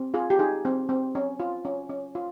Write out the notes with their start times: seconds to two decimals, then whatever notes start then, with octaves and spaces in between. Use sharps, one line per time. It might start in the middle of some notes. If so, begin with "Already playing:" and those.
Already playing: C4
0.14 F4 G#4
0.30 G4
0.39 D#4 G#4
0.65 C4
0.89 C4
1.15 C#4
1.40 F4
1.65 C#4
1.89 C#4
2.15 F4